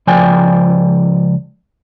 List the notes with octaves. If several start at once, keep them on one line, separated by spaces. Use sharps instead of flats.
C#2 F3 D5 G5 G#5